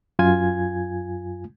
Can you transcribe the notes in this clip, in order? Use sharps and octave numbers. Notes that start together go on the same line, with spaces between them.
F#2 F4 G#5 G#6